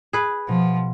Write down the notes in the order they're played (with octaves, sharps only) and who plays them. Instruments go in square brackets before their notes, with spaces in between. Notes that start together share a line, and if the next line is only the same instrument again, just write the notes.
[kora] G#4 B4
[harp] B2 [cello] F3